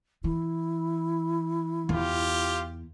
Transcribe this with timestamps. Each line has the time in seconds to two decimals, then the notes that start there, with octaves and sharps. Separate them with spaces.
0.24 E3 E4
1.89 E2 F4 G4